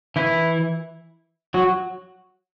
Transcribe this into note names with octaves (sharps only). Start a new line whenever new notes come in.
E3 E4
F#3 F#4